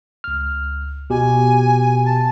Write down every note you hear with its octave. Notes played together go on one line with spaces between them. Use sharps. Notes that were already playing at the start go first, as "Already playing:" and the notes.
C#2 F6
B2 G4 G#5
A5